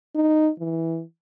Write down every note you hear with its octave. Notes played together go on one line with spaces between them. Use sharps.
D#4
E3